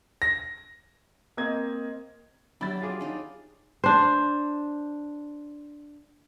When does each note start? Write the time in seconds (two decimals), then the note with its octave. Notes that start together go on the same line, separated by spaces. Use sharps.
0.22 A#6
1.37 A#3 C4 D#5 G#6
2.61 F#3 D4 G4 E5 B5 A6
2.82 F4 G#4 D6
3.01 D4 D#4 C#5
3.84 D4 C5